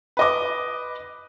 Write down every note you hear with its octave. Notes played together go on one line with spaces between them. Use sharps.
B4 D#5 D6